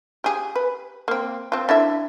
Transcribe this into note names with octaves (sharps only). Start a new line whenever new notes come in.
G4 G#4
B4
A#3 C4
C4 F4
D3 E4 E5